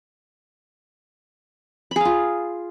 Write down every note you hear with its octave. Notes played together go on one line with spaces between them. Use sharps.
F4 G#4 F5 B5